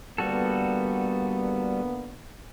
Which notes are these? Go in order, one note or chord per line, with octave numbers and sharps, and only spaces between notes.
D3 G3 A#3 B3 F#4 A4